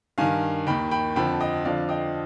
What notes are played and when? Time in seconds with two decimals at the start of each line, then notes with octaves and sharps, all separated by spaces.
0.18 G2 D#3 F5 G#5
0.67 D#2 D#3 G5 B5
0.91 G5 B5
1.16 F2 D3 F3 G5 B5
1.40 D#5 G5
1.65 F2 D3 F3 D5 F5
1.89 D#5 G5